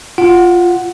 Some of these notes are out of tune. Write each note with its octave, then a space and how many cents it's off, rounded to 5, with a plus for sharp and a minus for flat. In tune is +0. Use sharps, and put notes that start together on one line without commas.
F4 +0 F#5 +0